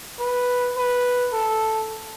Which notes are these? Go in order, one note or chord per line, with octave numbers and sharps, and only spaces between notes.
B4
B4
A4